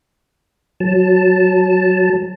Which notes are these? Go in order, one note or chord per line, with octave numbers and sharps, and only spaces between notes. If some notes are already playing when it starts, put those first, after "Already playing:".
F#3 A5